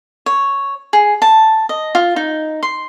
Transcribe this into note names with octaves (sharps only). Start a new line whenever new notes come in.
C#5
G#4
A5
D#5
F4
D#4
C6